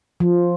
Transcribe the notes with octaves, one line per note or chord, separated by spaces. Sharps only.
F3